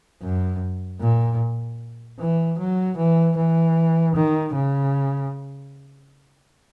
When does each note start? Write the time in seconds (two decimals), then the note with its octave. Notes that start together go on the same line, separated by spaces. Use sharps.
0.22 F#2
1.01 A#2
2.20 E3
2.59 F#3
2.97 E3
3.37 E3
4.16 D#3
4.55 C#3